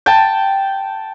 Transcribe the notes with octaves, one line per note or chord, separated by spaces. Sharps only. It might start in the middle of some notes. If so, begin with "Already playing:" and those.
G5 A5